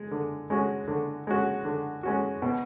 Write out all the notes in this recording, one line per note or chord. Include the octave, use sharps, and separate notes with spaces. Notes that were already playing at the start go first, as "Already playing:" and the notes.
Already playing: G#3
D3
G#3 C#4 F#4
D3
G#3 C#4 F#4
D3
G#3 C#4 F#4
B2